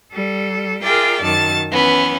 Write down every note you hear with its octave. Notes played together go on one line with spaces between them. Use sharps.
G3 A4
F4 G#4 A#4 D5 E5 G5
F#2 D#3 F#3 A5 A6
E3 B3 C#4